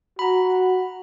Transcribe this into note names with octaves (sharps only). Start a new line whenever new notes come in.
F#4 A#5 B5